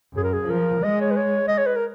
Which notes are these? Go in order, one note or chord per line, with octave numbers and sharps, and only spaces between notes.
F#2 G#4
A#4
G#4
F3 A#4
G#3 D#5
C#5
B4
C#5
D#5
C#5
B4
A#4